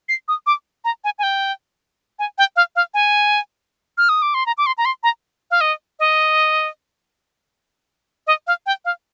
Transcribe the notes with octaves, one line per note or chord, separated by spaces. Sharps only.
C7
D#6
D6
A#5
G#5
G#5
G5
G#5
G5
F5
F5
G#5
F6
D#6
D6
C6
A#5
D6
C6
A#5
C6
A#5
F5
D#5
D#5
D#5
F5
G5
F5